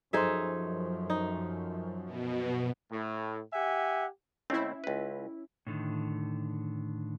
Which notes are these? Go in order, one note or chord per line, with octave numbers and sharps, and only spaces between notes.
F#2 F3 D#4 G#4 A4 C5 E5 C6
D#4
B2
A2
G4 E5 F#5 G#5
D#2 A3 C4 C#4 E4
C#2 B4
A2 D3 D#3